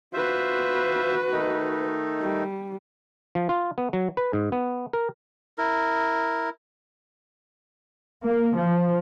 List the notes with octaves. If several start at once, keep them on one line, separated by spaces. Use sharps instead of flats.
F4 F#4 B4 C5 E5
D#3 A3 D#4
G3
F3
F4
B3
F#3
B4
G#2
B3
A#4
E4 A#4
A#3
F3